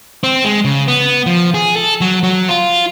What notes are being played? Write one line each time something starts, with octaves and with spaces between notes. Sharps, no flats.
C4
G#3
C#3
B3
F3
G#4
A4
F#3
F#3
F4